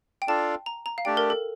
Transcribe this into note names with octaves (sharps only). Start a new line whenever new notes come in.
G5
D4 F4 A4 D5 F5 A5
A#5
A#5
F5
A3 D4 G4 D5 G5
A#4
A4